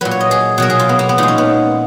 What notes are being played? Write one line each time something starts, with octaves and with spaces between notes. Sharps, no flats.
A#2 F#3 B4
C#5
D#5
G#4
B2 F#3 A#4
G#4
F4
B3
A#3
B3
A#2 G#3 D#4
C#4
B3